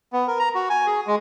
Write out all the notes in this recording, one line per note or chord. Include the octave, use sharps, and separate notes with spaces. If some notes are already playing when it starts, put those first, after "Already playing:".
B3
A#4
A#5
F#4
G#5
G#4
G#3